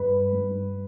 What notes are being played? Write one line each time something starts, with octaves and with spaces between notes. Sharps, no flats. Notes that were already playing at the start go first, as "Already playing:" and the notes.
Already playing: G2 B4
G2